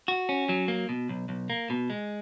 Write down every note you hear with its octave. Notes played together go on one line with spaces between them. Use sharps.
F#4
C#4
F#3
A#3
B2
B1
B1
A#3
B2
G#3